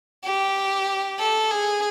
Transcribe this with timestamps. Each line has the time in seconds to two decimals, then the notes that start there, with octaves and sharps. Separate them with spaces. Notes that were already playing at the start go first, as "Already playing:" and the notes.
0.24 G4
1.19 A4
1.51 G#4